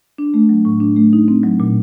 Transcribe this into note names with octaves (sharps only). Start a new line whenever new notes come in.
D4
A3
F#3
A2
D4
A3
D#4
C4
F#3
A#2